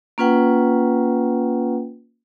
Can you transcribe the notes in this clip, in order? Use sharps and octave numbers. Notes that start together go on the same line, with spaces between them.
A#3 C#4 F4 B4 F#5 G5